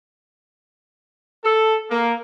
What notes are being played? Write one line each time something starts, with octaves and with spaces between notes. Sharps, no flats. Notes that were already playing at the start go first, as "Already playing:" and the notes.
A4
A#3